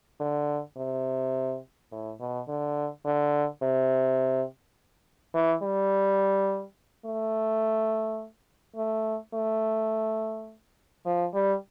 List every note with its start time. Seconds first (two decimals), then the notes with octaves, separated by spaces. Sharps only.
0.20 D3
0.77 C3
1.92 A2
2.20 B2
2.48 D3
3.06 D3
3.62 C3
5.34 E3
5.63 G3
7.05 A3
8.76 A3
9.34 A3
11.06 F3
11.34 G3